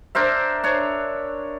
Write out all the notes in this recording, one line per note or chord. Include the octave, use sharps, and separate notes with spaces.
D4 A#4 C5 E5
D4 C#5